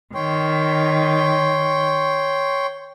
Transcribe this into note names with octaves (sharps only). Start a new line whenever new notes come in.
D#3 C#5 G5 C6